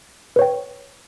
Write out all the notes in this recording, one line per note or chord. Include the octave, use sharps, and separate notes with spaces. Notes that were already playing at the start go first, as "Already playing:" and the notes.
B4 C#5 G5